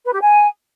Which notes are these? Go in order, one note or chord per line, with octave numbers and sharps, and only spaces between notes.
B4
G4
G#5